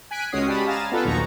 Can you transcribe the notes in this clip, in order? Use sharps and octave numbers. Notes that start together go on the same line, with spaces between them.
G#5 F#6 B6 D7
C#2 G#3 C#4 F#4 D#6 C7
F#4 G4 D5 A5 B5 D#6
F5 G#5 A#5 A6 E7
B3 D4 F4 A4 B4
A#1 D#2 F#3 D#4 A#5 C#6